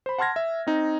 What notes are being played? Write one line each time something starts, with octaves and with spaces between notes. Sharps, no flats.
C5 B5
F#5 A5 C6 F6 G#6 A#6
E5
C4 D#4